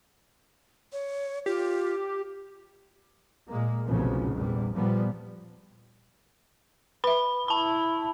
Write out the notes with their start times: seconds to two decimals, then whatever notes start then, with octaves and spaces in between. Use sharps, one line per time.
0.92 C#5
1.46 F4 G4
3.48 A#2 G#3 A#3
3.86 F1 B1 A#2 C#3 F3
4.32 A#1 E2 G3
4.75 A#2 F3 G3 B3
7.04 B4 E5 B5
7.48 E4 A5 B5